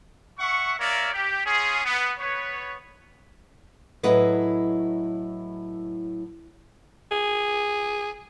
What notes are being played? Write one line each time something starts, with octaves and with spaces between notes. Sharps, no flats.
E5 F#5 C#6
A#3 A#4 C#5 D5 E5
G4
C#4 F4 G#4
B3
B3 B4 C#5
A2 F#3 E4 G#4 B4 D#5
G#4